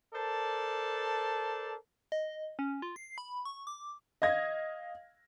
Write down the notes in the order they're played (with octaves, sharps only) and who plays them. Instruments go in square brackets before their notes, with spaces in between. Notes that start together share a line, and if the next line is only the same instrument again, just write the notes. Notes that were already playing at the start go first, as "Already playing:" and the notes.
[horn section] A4 A#4 C5 D5 A5
[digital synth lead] D#5
C#4
F4
C7
B5
C#6
D6
[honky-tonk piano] D#5 F5 G#6 A#6